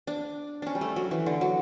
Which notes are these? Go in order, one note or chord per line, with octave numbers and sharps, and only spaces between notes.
D4
C#4 D4
G3
A3
F#3
E3
D3
F#3